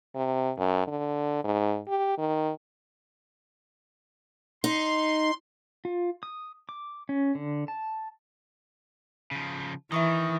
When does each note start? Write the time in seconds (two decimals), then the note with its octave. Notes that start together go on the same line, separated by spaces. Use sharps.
0.16 C3
0.58 F#2
0.87 D3
1.44 G#2
1.88 G4
2.18 D#3
4.64 D#4 C6
5.85 F4
6.23 D#6
6.69 D6
7.09 C#4
7.35 D3
7.68 A5
9.31 C#3 F3
9.92 D#3 E3 E5 C#6 D#6